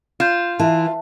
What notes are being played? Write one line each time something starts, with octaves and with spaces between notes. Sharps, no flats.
F4 G6 E7
E3 E5 A5